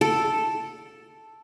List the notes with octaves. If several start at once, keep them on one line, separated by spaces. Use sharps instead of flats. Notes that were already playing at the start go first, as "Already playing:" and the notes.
A4